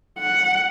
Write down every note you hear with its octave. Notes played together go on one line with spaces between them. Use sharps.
F#5